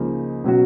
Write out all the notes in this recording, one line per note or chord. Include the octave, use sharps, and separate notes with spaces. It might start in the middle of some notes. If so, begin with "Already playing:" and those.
Already playing: C#2 C#3 F3 A#3 D#4
B2 F#3 C#4 F#4